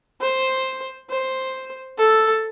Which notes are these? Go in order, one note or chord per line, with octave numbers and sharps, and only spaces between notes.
C5
C5
A4